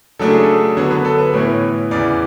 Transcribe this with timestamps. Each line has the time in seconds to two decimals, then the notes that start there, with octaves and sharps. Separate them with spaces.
0.19 C#3 F#3 A3 D4 A4
0.31 G#4
0.43 A4
0.77 D3 F#3 B3 C#5
0.90 B4
1.05 A4
1.18 B4
1.34 A2 E3 B3 E4 C#5
1.91 E2 C#3 E3 D5